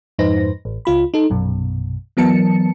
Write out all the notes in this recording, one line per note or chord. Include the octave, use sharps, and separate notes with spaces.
F2 G#2 D#4 B4 C5 A#6
A1
C#2 F4 B5
D#4 A4
A#1 F#2 B2
E3 F#3 B3 A#4 A5 C#7